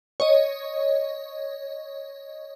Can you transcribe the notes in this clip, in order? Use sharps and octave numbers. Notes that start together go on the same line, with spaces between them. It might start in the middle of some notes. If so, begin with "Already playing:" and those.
C#5 D#5